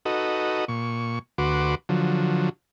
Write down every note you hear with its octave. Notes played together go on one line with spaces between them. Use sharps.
D#4 F#4 A4 B4 D#5
A#2 C#6
D2 F#4 B4 C6 D6
D3 F3 F#3